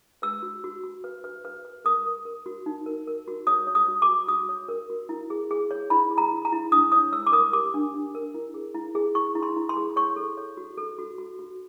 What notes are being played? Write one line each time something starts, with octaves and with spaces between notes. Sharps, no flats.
B4 E6
F#4
F#4
F#4
B4
B4
B4
B4
A#4 D#6
A#4
A#4
F#4
D#4
A#4
A#4
F#4
C#5 D#6
C#5
D#6
F#4
D6
F#4
F#4 D#6
C#5
A#4
F#4
E4
G#4
G#4
C#5
E4 B5
G#4
A#5
E4
A#5
E4
D4 D#6
C#5 D#6
C#5 E6
D6
A#4 D#6
G4 D6
D4
D4
A#4
E4
G#4
E4
G#4
E4 C#6
E4
C6
E4
C6
G#4
C#5 C#6
A4
C#5
F#4
A4
F#4
F#4
F#4